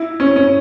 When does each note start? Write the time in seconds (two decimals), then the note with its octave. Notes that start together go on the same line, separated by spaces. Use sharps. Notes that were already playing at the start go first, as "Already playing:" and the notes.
Already playing: E4
0.20 C#4
0.36 C#4